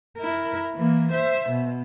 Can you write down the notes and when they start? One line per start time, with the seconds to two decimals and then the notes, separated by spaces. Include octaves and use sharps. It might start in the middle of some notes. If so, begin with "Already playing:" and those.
0.18 E4 A#4
0.75 E3 A#3
1.12 C5 E5
1.49 B2